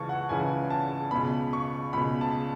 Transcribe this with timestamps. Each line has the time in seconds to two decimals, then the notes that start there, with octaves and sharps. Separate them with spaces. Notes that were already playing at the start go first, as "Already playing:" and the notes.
Already playing: C#2 C#3 E3 A5 C#6
0.09 F#5
0.29 C#2 C#3 E3 G#5
0.70 A5
1.11 C#2 B2 B5
1.53 C#6
1.93 C#2 B2 B5
2.21 A5